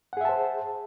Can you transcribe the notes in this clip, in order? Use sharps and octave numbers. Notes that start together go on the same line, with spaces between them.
G#4 C5 E5 F#5 A5